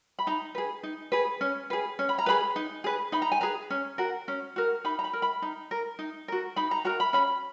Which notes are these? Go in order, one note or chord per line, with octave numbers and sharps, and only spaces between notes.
B5
D#4 A#5
G#4 B4
D#4
G#4 B4
C#4
G#4 B4
C#4
B5
A#5
G#4 B4 B5
D#4
G#4 B4
D#4 B5
A#5
G#5
G#4 B4 A#5
C#4
F#4 A#4
C#4
F#4 A#4
D#4 B5
A#5
B5
A#4
B5
D#4 A#5
A#4
D#4
F#4 A#4
D#4 B5
A#5
F#4 A#4 A#5
B5
C#4 B5